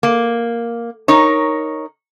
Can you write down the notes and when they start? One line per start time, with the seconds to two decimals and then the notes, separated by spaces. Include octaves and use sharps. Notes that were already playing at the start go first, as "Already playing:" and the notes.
0.03 A#3
1.08 D#4 A#4 C#5